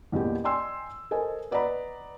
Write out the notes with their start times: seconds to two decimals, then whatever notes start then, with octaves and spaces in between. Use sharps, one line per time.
0.12 A1 E2 A#2 G4
0.44 D5 D#5 G5 G#5 C6 E6
1.11 A4 A#4 C5 D#5 G#5
1.51 B4 D5 D#5 F#5 A#5 B5